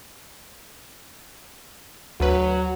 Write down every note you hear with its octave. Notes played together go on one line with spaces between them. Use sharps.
D2 F#3 B4